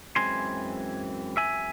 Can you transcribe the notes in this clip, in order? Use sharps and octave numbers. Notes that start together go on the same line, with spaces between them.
F#2 E3 G#3 C4 G#5 C6
E5 G#5